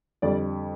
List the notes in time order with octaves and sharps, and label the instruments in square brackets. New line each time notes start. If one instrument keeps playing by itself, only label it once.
[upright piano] F2 D3 G3 D5